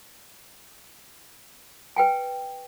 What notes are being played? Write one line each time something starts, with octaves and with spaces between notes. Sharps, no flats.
B4 G5 G#5